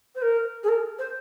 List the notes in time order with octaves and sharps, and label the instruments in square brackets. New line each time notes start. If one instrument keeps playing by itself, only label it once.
[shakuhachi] C5
A#4
G#4
A#4
C5